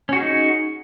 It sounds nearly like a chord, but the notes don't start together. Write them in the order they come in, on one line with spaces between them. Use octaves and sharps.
C#4 F#4 G#4 D#4